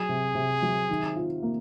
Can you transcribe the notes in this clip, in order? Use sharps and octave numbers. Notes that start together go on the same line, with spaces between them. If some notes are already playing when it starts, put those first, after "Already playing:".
Already playing: F#3 G#4
C3
C3
F#3
D#3
F4
A#3